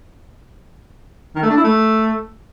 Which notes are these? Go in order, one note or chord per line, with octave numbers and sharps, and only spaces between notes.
D#3
A3
D4
E4
A3